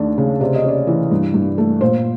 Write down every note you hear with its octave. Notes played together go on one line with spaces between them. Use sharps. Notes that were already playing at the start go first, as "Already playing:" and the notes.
Already playing: D#2 A3 D4
C#3
C3 D5
D#5
C#4 D5
E3
G2
G2
A3
A#2 C5